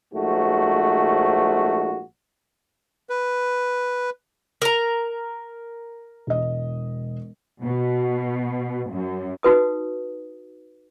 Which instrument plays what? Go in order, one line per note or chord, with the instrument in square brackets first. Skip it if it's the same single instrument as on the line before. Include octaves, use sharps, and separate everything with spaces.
[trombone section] A#1 G#2 A3 F#4
[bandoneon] B4
[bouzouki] A#4 A#5
[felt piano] E1 D#5
[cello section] B2
F#2
[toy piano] D#4 F#4 B4 D#6